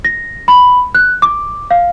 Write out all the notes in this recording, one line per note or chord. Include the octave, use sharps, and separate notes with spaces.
A#6
B5
F#6
D6
F5